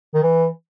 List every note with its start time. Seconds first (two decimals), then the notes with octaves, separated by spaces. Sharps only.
0.15 D#3
0.23 E3